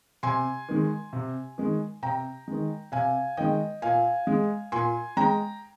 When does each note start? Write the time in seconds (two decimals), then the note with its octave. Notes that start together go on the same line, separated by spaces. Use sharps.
0.23 C3 G#5 C6
0.69 D#3 G#3
1.13 C3
1.58 D#3 G#3
2.03 C3 G5 A#5
2.48 D#3 G#3
2.92 C3 F5 G#5
3.37 D#3 G#3 D#5 G5
3.82 A#2 F5 G#5
4.27 G#3
4.72 A#2 G#5 C6
5.17 G#3 G5 A#5